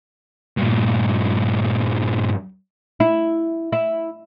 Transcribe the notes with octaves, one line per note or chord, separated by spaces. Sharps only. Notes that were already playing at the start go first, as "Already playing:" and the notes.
G2 A#2
E4
E4